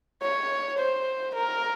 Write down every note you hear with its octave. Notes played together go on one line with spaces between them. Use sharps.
C#5
C5
A#4